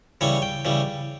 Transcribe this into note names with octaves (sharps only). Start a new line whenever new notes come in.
C#3 E3 G3 C#5
G5
C#3 E3 G3